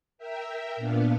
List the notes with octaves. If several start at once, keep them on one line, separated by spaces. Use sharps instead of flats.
A#4 E5 G5
A#2 B3 D4 F5